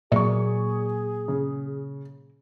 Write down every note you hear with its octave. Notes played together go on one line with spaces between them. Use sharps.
A#2 F#3 A#3 G#4 D5 C#6
C#3